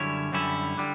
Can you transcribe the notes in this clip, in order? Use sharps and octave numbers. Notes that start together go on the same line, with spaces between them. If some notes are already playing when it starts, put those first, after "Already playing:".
Already playing: F#2 D3 G3 C#4 E4 C#5
F#2 D3 G3 C#4 E4
D3 G3